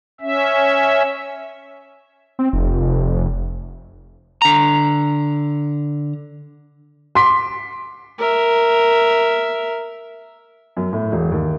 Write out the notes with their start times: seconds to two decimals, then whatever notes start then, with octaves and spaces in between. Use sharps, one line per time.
0.21 C#4 E5
2.39 C4
2.53 F1
2.80 F1
4.42 D3 A#5
7.15 C6 D6 B6
8.18 A#4 E5
10.77 F#2
10.93 A2
11.12 E1
11.32 D#2